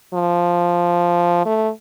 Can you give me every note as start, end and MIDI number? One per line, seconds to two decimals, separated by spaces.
0.14 1.45 53
1.46 1.70 57